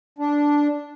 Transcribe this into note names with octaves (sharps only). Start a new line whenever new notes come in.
D4